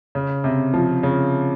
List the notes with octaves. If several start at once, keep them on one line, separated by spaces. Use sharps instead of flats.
C#3
C3
F3
C#3